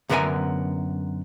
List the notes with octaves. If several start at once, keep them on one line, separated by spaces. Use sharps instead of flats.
F#2 D3 B3 A#4 E5 G#5